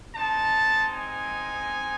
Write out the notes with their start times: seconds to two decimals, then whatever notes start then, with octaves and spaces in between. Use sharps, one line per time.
0.15 G#3 C4 D#4 A5
0.93 G#5